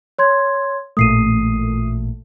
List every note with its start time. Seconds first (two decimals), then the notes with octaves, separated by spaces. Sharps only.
0.19 C#5 C6 G#6
0.97 A1 A#2 A3 D#6 C7 D#7